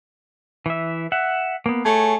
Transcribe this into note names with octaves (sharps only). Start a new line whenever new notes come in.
E3 E5
E5 F#5
A#3 B3
A3 G#4 C#5